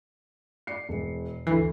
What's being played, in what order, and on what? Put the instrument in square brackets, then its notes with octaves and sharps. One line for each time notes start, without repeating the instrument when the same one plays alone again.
[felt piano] D5 C7 C#7
E1
[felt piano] D2 C7 [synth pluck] E3